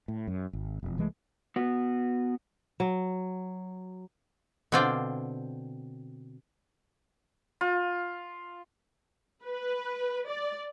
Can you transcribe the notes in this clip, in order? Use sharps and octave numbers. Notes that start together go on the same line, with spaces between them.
A2
F#2
G#1
E1 F2
C2 E3 G#3 A3
B3 F#4
F#3
B2 D3 C4 F4 D5 G5
F4
B4
D5